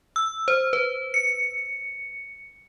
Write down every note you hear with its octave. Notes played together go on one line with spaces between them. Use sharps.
E6
C5
B4
C#7